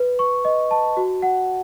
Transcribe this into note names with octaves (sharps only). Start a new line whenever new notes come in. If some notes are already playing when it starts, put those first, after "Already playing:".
Already playing: B4
C#6
D#5
A5
F#4
F#5